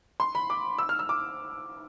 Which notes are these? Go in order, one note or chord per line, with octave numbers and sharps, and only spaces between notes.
C6
B5
D6
E6
F6
E6
D6